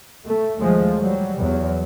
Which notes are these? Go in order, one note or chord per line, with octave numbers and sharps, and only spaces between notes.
A3
D#2 F3 G#3 A3
F#3 G3
E2 F#3